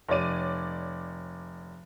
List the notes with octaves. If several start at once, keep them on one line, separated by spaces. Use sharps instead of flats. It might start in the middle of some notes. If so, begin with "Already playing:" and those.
F1 C#5 D5 D#7